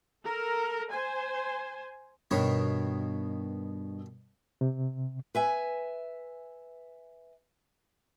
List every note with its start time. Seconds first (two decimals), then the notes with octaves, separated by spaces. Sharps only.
0.24 A4 A#4
0.92 C5 G#5
2.31 G2 B2 D#3 C#5
4.61 C3
5.35 B4 E5 G#5